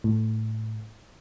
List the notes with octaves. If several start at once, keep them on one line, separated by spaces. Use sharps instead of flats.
A2